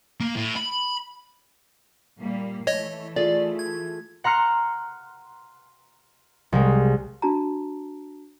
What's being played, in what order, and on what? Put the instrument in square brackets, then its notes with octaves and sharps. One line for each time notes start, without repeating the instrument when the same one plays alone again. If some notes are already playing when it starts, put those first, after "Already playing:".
[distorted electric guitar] A#3
A2
B5
[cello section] A#2 G3 A#3
[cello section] E3 A3 [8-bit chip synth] C#5 D#5
[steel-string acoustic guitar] F4 G#4 A4 [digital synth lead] D5
[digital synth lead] G#6
[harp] F#5 A#5 C6 F6 C#7
C2 G#3
[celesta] D4 F#4 A5 A#5